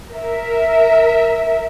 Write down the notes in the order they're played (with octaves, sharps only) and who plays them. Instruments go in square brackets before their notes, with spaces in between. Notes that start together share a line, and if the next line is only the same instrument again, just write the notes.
[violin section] A#4 E5